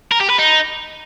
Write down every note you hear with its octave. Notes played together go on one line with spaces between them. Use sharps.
A#4
G4
B4
D#4